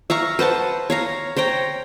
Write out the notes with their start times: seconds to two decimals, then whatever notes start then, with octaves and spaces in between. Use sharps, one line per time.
0.10 E5 F5 A#5 C#6
0.39 B4 C5 F#5 A5
0.90 C#5 F5 A#5
1.36 C5 C#5 G5 A#5